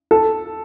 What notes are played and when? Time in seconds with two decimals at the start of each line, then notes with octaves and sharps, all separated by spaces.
0.11 A4